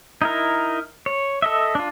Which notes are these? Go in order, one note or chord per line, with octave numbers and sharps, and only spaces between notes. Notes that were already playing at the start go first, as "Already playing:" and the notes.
D#4 E4 A#4
C#5
A4 D#5 E5
D4 F4